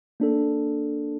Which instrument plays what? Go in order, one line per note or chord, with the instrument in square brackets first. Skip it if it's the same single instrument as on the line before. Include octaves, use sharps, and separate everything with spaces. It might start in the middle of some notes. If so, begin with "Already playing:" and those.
[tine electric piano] A#3 D4 A4